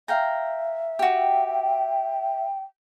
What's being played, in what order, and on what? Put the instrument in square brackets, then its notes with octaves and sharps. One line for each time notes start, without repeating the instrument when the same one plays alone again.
[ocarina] E5 [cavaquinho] F5 G5 A#5
[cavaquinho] F#4 G4 [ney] G5